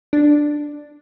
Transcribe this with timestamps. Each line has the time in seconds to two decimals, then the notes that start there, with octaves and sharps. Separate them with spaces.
0.13 D4